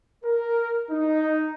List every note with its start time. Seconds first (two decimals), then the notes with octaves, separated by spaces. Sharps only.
0.25 A#4
0.91 D#4